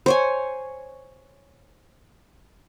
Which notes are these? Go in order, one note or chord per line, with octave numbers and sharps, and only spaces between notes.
C5 C#5 G#5